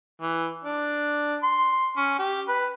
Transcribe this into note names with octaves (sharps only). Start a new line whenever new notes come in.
E3
D4
C6
C#4
G4
B4